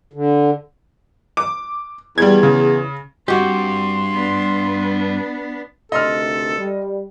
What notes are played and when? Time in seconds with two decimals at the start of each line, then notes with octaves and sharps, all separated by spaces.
0.13 D3
1.37 D6
2.18 E2 G3 G#6
2.43 C#3
3.28 G2 C4 F#4 G4 C6
4.13 B3 D4
5.92 D2 C3 D#3 A4 D#5 C6 F6
6.57 G3